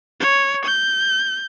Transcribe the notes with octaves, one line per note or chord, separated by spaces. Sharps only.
C#5
G6